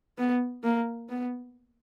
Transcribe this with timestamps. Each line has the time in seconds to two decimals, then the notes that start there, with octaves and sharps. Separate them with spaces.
0.18 B3
0.64 A#3
1.09 B3